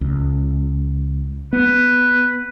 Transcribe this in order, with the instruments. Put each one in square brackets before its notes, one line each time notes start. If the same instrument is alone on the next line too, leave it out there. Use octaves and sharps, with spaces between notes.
[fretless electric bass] C#2
[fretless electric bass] B3 [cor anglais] B4